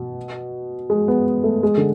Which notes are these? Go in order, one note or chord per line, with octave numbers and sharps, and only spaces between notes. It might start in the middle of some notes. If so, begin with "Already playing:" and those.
Already playing: B2
G#3
B3
A3
G#3
D3